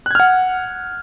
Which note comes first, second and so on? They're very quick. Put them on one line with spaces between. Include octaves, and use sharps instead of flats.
F#6 G#6 F6 F#5